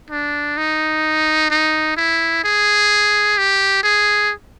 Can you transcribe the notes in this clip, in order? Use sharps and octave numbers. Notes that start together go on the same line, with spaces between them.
D4
D#4
D#4
E4
G#4
G4
G#4